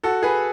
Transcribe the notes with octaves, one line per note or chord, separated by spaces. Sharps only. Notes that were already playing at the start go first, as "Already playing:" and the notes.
F#4 A4
G#4 B4